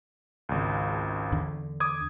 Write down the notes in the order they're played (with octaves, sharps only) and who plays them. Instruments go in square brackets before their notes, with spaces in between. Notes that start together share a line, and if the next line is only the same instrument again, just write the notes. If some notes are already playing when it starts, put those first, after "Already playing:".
[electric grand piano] G#1 C#2
[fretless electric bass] E2 D3
[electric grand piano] D6 D#6 G#6